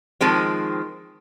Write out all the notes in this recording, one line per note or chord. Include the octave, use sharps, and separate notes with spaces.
D#3 F3 G#3 C4